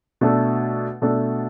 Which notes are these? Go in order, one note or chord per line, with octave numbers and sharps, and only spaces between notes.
B2 A3 D4 A4
B2 A3 D4 A4